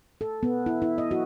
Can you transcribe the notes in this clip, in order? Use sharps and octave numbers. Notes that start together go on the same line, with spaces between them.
A4
B3
E4
E4
D#5
F#4